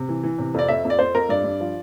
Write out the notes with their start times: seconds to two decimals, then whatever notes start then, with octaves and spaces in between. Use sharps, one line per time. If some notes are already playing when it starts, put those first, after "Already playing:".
Already playing: C3
0.09 E3
0.23 E3
0.39 C3
0.54 F2 D5
0.68 F2 E5
0.85 F2
0.90 D5
0.99 F2 C5
1.14 F2 A#4
1.29 G2 D5
1.44 G2
1.60 F3